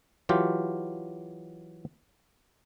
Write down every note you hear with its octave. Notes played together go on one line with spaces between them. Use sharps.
E3 F#3 F4 G4